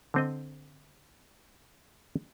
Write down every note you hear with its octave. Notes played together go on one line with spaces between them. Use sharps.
D3 C4 D#5